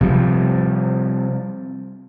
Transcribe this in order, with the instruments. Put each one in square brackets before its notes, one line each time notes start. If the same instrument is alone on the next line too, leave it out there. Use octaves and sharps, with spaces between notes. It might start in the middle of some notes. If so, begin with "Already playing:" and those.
[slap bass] C3 F3 G3